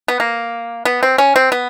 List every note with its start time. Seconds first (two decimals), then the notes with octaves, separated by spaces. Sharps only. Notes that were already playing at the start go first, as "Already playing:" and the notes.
0.08 B3
0.20 A#3
0.85 B3
1.03 C4
1.18 C#4
1.36 C4
1.52 B3